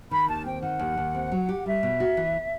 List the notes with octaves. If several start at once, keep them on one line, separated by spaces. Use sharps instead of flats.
D#3 B5
D#2 A5
C4 G5
D#3 F#5
D#2
D#2
C4
F#3
G4
G3 E5
B2
F#4
E3